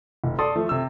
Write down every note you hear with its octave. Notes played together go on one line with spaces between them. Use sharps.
F1
A4 D5 C6 D#6 A6
F3 A3
C3 E6